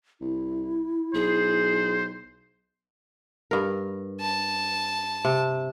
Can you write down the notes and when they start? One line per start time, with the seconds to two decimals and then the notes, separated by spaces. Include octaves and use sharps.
0.21 C2 E4
1.14 B1 G#4 C5
3.51 G2 A#4
4.21 A5
5.25 C3